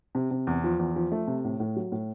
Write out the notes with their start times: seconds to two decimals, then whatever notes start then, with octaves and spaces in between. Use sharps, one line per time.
0.15 C3
0.31 C3
0.47 E2
0.64 F3
0.79 E2
0.96 F3
1.12 A3
1.27 C3
1.44 A2
1.60 A2
1.76 F#3
1.92 A2